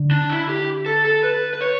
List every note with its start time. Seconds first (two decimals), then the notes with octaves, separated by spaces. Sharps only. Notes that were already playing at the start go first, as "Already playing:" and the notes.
Already playing: D3
0.11 D4
0.30 E4
0.49 G4
0.86 A4
1.05 A4
1.23 B4
1.53 B4
1.61 C#5